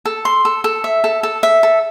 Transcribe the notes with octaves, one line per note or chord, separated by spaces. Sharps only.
A4
C6
A4
A4
E5
A4
A4
E5
A4